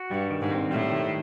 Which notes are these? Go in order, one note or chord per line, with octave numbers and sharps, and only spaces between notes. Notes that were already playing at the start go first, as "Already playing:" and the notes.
Already playing: F#4
G2 G3
D#3
G#2
C4
A2 G3
D#3